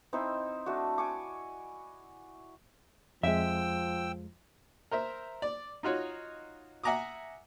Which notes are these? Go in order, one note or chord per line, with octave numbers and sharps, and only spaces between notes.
C4 D#4 E4 C5
A3 D4 F#4
G#5 C#6 D6
F2 F3 G#3 E5 G5 E6
A#4 C5 E5
D5
D#4 F4 F#4 C#5
E5 F#5 G#5 A#5 D6 D#6